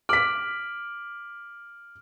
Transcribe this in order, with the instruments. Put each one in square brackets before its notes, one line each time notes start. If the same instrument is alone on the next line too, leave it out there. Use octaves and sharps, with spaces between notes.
[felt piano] D6 B6 [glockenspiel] F6 D7 F#7